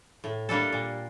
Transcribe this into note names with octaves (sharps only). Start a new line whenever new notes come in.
A2
G3 A#3 D4 A4
A#2